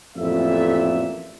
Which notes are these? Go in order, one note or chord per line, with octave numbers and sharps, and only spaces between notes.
A1 F2 A#2 A4 E5